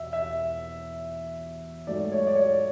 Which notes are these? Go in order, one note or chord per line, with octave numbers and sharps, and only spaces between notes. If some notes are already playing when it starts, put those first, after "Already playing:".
Already playing: E2 B2 E5
E5
G#2 F#3 A3 D5
C#5
D5
C#5